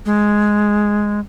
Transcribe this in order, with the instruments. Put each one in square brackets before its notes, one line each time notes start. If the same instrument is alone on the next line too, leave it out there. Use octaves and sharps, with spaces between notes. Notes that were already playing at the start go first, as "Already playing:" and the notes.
[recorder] G#3